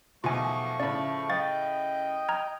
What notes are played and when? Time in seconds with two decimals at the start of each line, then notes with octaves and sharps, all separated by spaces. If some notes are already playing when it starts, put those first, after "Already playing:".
0.24 B1 E2 B2 F3 A3 F4 G#5 C#6
0.80 A2 C#3 D5
1.29 D#5 F5 G5 C#6 A6
2.29 A#5 F6 G#6